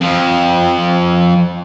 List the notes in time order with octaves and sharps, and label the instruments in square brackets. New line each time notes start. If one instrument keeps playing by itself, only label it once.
[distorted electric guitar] F2 F3